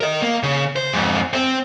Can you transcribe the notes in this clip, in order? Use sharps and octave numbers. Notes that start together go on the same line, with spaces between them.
A#4 D#5
A#3
C#3
C5
F2 G#2
C4